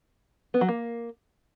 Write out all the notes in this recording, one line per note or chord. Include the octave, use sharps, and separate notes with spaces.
B3
F#3
A#3